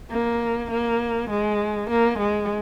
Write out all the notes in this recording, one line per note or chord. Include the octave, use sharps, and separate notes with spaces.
A#3
A#3
G#3
A#3
G#3